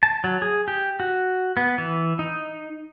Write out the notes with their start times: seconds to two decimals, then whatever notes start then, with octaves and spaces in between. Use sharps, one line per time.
0.03 A5
0.24 F#3
0.42 G#4
0.68 G4
1.00 F#4
1.57 B3
1.78 E3
2.19 D#4